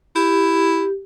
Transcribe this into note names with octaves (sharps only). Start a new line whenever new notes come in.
E4 G4